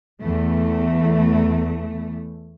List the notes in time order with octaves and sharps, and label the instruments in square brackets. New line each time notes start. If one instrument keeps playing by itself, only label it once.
[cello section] E2 A3